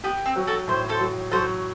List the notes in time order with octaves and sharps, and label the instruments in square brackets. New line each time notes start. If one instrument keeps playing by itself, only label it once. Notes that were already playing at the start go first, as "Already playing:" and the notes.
[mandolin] B3 [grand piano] G4
[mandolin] C4
[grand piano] F#3
[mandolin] F#4 A4
[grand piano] A2 [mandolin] C5
[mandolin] A4 C5
[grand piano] F#3
[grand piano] F#3 [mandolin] A4 C5